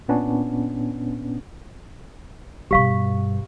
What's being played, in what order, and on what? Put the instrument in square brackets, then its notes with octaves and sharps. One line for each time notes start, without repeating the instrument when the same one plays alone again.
[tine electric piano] A#2 B3 C#4 D4
[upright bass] G2 B2 [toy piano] G4 F5 C#6